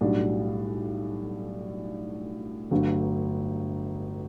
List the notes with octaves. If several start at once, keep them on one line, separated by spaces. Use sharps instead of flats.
B1 A2 G3 D4 F#4
G1 G2 F#3 A3